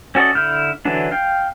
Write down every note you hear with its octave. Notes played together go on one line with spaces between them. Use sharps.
C#4 F#4 A4 D5 D#5
D3 E4 F6 G6
D3 E3 F#3 D4
F5 G5